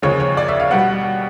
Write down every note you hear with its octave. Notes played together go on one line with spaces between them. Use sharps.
D#2 C#3 F3 G#3 C#4 C#5
C#5
D5
E5
F5
B2 G3 B3 F#5